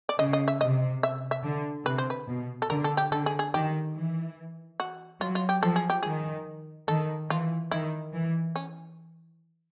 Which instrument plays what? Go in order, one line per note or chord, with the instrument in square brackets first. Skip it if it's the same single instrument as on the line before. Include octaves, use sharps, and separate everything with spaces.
[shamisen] D5
[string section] C#3 [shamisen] D#5
[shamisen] D#5
E5
[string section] C3 [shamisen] D#5
[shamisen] E5
E5
[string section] D3
[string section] C3 [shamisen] B4
[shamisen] C5
B4
[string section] B2
[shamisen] A4
[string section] D3 [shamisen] A#4
[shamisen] A4
G4
[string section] D3 [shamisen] A4
[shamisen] G#4
G#4
[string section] D#3 [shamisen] G4
[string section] E3
[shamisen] F#4
[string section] F#3 [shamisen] F4
[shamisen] F4
G4
[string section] F3 [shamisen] A4
[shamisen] G#4
G4
[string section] D#3 [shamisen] G#4
[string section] D#3 [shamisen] A4
[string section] E3 [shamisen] F4
[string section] D#3 [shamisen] E4
[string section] E3
[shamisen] C#4